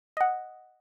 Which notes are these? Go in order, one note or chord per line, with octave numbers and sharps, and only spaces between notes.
D#5 F#5